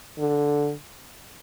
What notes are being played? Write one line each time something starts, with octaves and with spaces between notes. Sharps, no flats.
D3